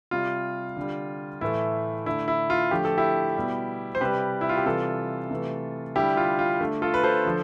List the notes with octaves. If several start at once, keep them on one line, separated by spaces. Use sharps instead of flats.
C3 G3 F4
D3 G3
A2 E3 A3 E4
D3 A3 E4
E4
F4
D3 F3 A3 G4
A4
E4 G4
B2 G3
C5
C3 G3 G4 B4
E4
F4
G4
C3 E3 G3 F4 A4
C3 E3 A3
D3 G3 E4 G4
F4
F4
D3 A3
F4 A4
B4
A4 C5
D3 F3